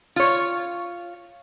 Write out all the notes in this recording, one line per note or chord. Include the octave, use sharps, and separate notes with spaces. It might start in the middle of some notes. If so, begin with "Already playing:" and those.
F4 C#5